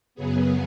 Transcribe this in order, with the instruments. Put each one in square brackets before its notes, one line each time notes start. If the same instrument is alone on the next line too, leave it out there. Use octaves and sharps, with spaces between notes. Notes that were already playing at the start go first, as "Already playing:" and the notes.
[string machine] F#2 C#3 F#3 B3 G#4